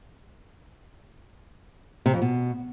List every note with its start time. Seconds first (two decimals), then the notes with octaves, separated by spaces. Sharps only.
2.06 C3
2.14 F2
2.22 B2